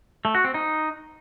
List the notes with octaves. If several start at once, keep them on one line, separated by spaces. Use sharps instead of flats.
A3
F#4
C4
D#4